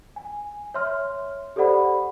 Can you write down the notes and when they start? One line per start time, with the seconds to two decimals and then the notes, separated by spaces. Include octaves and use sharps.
0.16 G#5
0.74 C#5 E5 C6 F6
1.56 G4 A4 C5 D5 F#5 B5